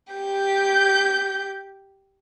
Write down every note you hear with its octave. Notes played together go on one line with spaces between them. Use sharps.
G4 G6